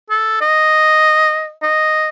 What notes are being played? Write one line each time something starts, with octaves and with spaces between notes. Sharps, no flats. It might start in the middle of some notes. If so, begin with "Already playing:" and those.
A4
D#5
D#5